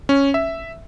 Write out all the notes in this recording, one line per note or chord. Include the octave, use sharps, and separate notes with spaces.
C#4
E5